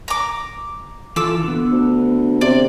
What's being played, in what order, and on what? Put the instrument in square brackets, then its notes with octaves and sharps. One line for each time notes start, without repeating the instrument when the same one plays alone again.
[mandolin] A#5 D6
[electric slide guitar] E3 F4 A4 [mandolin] D6 E6
[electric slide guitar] D3 B3
[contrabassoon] D2
[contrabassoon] C3 [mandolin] D5